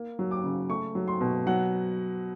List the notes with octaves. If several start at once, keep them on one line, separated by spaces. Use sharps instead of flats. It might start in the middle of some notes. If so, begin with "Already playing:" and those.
Already playing: A#3
F#3
D6
C#3
A3 C#6
F#3
C6
B2
F#3 F#5